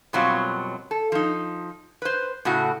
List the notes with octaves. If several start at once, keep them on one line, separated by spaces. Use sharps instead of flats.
F#2 B2 F#3 G3 C4 F4
A4
F3 D#4
B4 C5
A2 C#3 F#4